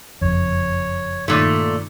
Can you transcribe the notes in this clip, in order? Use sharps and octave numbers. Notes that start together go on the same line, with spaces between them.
F#1 F2 C#5
G2 A#2 D#3 A3